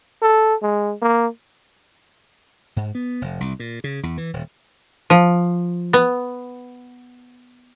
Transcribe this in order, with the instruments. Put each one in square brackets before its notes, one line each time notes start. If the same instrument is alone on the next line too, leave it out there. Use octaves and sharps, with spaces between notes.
[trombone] A4
G#3
A#3
[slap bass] G#2
B3
F1
C2
A#2
C#3
E2
E3
D#1
[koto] F3
B3